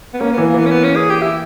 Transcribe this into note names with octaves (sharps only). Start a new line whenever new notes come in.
B3
A#3 C#4
E3 B3
A#3
E3 B3
C#4
B3
C#4
G#4
G4
E4